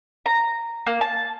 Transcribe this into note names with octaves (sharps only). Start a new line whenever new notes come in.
A#5
A#3
A5